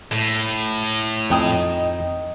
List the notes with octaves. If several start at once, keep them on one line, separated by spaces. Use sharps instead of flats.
A2
F2 D#4 D#5 G5 G#5 A#5 D#6